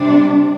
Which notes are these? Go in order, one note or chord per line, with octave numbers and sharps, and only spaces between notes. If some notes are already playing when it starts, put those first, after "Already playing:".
Already playing: C3 G3 D4